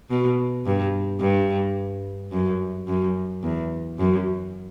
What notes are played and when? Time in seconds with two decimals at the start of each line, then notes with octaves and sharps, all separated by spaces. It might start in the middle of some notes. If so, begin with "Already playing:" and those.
0.10 B2
0.66 G2
1.20 G2
2.32 F#2
2.87 F#2
3.43 E2
3.98 F#2